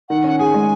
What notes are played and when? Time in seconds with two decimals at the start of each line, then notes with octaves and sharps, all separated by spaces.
0.09 D#3 F#5
0.24 C#4 F#5
0.39 G#4 G#5
0.54 G#3